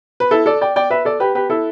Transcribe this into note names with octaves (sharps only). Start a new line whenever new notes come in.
B4
E4 A4
A4 D5
D5 G5
D5 G5
B4 E5
A4 D5
G4 B4
G4 B4
E4 A4